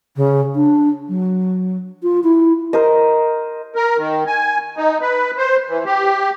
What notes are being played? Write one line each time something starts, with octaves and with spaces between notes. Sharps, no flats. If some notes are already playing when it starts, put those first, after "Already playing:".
C#3
D4
F#3
F4
E4
A#4 C5 D#5
A#4
D#3
G#5
D#4
B4
C5
E3
G4